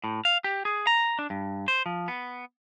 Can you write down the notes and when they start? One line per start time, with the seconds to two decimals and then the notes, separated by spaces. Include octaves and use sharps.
0.04 A2
0.25 F5
0.44 G4
0.65 G#4
0.87 A#5
1.19 D4
1.30 G2
1.68 C5
1.86 F3
2.08 B3